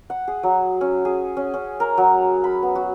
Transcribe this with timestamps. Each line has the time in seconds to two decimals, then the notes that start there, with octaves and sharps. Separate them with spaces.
0.10 F#5
0.28 G#4
0.43 F#3
0.81 C#4
1.05 G#4
1.37 C#4
1.54 C#4
1.80 A#4
1.98 F#3
2.44 B5
2.63 B3
2.75 F#4